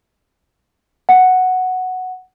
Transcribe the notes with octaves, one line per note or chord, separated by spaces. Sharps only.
F#5